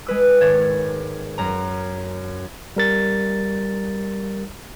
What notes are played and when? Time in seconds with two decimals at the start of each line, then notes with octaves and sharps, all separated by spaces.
0.06 G#3 B4 E6
0.41 G#1 C#5 G#6 A6
1.38 F#2 A#5
2.76 G3 A#4 A6